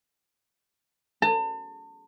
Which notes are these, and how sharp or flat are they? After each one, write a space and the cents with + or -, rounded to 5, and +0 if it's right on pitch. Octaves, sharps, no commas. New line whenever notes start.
A5 +40